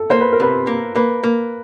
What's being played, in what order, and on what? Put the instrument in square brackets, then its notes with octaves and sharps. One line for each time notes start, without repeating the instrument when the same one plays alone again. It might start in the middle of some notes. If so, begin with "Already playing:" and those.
Already playing: [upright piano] A4
[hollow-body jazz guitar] A#3 [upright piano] C5
[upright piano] B4
A#4
[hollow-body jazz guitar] C3 [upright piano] B4
[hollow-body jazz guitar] A#3
[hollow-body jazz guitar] A#3 [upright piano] B4
[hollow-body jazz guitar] A#3